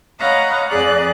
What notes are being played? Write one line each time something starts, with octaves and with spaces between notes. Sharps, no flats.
C#5 D#5 F5 F#5 A#5 B5
F2 G#4 D5 F#6